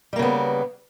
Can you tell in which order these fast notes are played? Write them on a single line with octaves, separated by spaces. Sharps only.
G3 A#3 C#3 B3